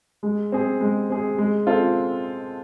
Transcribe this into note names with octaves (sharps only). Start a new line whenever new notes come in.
G#3
C4 G#4
G#3
C4 G#4
G#3
C4 F4 A4